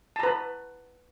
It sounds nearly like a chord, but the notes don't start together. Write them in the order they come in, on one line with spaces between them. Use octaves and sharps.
A5 A#5 B4